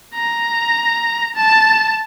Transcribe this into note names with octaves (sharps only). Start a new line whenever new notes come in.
A#5
A5